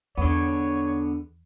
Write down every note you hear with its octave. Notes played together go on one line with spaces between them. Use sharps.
E2 D3 B3 C#5